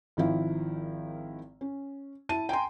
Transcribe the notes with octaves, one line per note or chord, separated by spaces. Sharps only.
G#1 D#3 F3 E4 F5
C#4
E4 A5 D#7
G5 G#5 A#5 C6